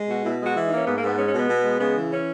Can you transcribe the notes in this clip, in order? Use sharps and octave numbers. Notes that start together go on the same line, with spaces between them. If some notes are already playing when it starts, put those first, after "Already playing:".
Already playing: G#3
B2 F#4
B2 E4
G#3
F#4
E3
A#3 D#4
C#4
G#2 B3
G#2 A#3
B3
G#3 C#4
C#4
B2
B3
B2
G#3
C#3 B3
E3
C#4